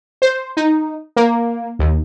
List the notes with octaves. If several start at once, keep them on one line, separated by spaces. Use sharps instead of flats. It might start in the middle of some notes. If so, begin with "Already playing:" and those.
C5
D#4
A#3
D#2